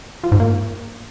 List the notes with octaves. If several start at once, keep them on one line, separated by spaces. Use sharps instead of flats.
F3
G#2
A#3